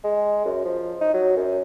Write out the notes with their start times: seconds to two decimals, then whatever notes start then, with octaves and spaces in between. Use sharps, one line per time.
0.04 G#3
0.45 F#2
0.65 F3
1.01 D#4
1.14 F#3
1.36 F#2